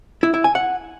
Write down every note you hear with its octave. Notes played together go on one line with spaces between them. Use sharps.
E4
E4
G#5
F#5